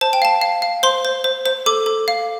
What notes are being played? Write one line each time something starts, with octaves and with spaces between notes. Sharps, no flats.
C5 A5
G5
F5 A5
F5
F5
C5 C6
C5
C5
C5
A4 D6
A4
F5